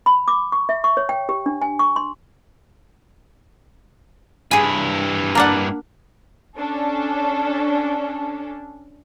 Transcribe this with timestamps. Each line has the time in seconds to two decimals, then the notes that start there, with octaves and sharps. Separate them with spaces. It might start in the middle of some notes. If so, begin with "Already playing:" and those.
0.06 B5
0.28 D6
0.52 C#6
0.69 E5
0.84 C#6
0.97 C#5
1.09 G5
1.29 G4
1.46 D4
1.62 G#5
1.79 C#6
1.96 C6
4.51 G2 E4 G#4 G#5
5.35 A#3 D4 F#5
6.57 C#4 D4 A4